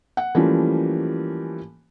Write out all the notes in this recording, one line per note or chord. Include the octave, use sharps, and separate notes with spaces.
F#5
E3 F3 G3 A3 A#3 C#4